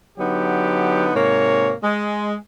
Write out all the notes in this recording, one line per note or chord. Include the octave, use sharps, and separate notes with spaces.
D3 F#3 B3 D#4 G4
G#2 C3 A#3 C#5
G#3